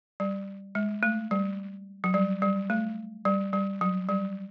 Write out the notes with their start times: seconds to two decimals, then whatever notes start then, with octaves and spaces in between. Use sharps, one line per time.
0.20 G3
0.75 G#3
1.03 A3
1.31 G3
2.04 F#3
2.14 G3
2.42 G3
2.70 A3
3.25 G3
3.53 G3
3.81 F#3
4.09 G3